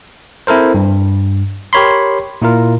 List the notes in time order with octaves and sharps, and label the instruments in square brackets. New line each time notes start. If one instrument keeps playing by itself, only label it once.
[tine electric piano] C4 E4 A4 A#4 C5
G2
G4 A#4 C#5 B5 C6
A#2 E4 F4 A#4